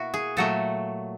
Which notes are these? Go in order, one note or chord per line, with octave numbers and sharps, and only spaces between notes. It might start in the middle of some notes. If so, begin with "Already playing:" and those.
Already playing: B2 A#3 E4 F#4
G#4
A#2 F#3 A3 A4